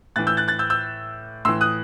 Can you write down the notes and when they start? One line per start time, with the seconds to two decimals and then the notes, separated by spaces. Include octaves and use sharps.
0.16 A2 E3 F#6 A6
0.27 E6 G6
0.37 F#6 A6
0.48 F#6 A6
0.59 E6 G6
0.70 E6 G6
1.45 A2 E3 C6 E6
1.61 D#6 F#6